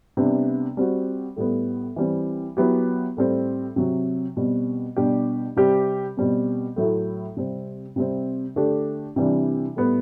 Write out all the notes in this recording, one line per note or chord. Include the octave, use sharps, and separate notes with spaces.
C3 G3 B3 D4
G3 C4 F#4
A2 G3 B3
E3 G3 C4
F#3 B3 E4 G4
A2 G3 C4
C3 F#3 C4
B2 G3 C4
B2 G3 D4 G4
C3 G3 C4 G4
B2 G3 C4
A2 F#3 A3 E4
C3 G3 C4
C3 G3 C4
D3 A3 D4 G4
C3 E3 G3 D4
A2 G3 B3